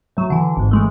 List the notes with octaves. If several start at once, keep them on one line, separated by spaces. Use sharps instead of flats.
A2 F#3
D3 E3
G#1 G#2
E3 G#3 A3